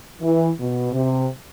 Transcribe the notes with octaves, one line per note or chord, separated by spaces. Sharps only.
E3
B2
C3